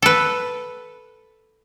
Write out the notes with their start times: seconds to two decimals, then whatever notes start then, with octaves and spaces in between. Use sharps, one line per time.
0.02 A4 B4